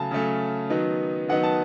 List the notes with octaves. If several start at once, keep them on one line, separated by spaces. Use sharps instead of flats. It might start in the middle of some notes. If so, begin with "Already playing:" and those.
Already playing: C#3 F#3 A3 C#4 A5
C#3 F#3 A3 C#4
D#3 F#3 B3 D#4
D#3 F#3 B3 D#4 F#5
A5